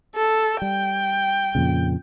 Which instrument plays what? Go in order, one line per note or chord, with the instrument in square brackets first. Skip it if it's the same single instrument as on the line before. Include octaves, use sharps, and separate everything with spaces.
[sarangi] A4
[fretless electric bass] G3 [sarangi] G5
[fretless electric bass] F2 A#2 C#3